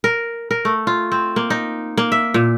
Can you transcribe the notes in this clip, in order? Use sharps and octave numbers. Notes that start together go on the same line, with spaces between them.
A#4
A#4
A3
F4
C4
A#3
D#4
A#3
E5
A#2